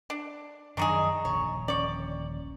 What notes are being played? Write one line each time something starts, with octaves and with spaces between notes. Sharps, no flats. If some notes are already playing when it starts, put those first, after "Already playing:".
D4
F#2 D#3 F3 D4 D#4 G#4 A#5 C#6
D#1 A#1 D3 C#5
C#4 C#5 D5